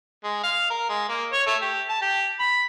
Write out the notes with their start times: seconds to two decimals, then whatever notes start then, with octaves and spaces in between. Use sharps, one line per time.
0.24 G#3
0.44 F5
0.70 A#4
0.89 G#3
1.09 A#3
1.32 C#5
1.47 A3
1.62 G4
1.89 A5
2.02 G4
2.39 B5